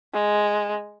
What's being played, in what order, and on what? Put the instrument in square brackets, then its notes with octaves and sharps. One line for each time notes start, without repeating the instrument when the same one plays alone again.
[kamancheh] G#3